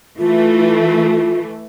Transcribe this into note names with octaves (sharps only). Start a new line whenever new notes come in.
E3 A3 F4